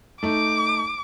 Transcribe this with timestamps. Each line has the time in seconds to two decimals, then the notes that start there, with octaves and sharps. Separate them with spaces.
0.23 A3 D#4 D6